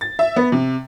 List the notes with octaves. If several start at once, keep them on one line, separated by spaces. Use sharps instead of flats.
A6
E5
B3
C3